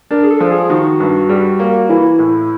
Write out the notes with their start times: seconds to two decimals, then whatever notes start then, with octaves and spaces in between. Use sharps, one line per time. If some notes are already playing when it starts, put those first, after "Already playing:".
0.11 D4 A#4
0.24 G#4
0.30 A4
0.40 F3
0.51 G#4
0.70 D#3 F#4
1.00 G2
1.29 G3
1.60 A#3
1.89 E3 E4
2.19 A2